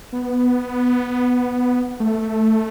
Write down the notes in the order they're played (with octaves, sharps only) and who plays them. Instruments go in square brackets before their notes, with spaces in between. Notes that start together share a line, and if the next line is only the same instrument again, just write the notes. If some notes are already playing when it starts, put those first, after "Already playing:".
[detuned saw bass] B3
A3